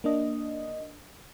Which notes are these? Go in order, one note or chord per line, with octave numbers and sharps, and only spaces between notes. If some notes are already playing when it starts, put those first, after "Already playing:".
A#3 D4 D#5